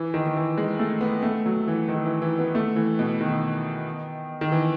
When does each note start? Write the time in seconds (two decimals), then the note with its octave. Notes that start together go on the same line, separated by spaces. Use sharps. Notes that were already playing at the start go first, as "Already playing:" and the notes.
Already playing: E3
0.14 D#3
0.26 D#3
0.36 E3
0.58 G#3
0.79 A3
1.01 B3
1.23 A3
1.46 F#3
1.68 E3
1.89 D#3
2.05 E3
2.22 E3
2.39 B3
2.55 A3
2.76 E3
2.99 B2
3.20 D#3
4.41 D#3
4.52 E3